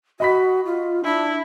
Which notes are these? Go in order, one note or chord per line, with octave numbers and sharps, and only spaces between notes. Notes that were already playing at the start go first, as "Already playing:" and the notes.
F#4 D#5 B5 B6
F4
D4 E4